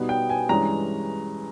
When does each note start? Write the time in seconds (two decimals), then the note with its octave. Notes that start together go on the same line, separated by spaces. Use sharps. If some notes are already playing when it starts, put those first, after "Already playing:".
Already playing: B2 G3 B3 D#4
0.09 G5
0.30 G#5
0.49 G2 E3 G#3 C#4 A#5